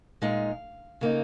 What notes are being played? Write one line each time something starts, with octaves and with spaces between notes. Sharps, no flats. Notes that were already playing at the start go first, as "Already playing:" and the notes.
A#2 G#3 D#4 F5
C#3 A#3 D#4